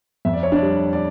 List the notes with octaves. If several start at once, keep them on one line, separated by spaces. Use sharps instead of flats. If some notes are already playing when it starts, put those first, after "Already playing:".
F2 E5
D5
C#5
D4 D5
G3
D5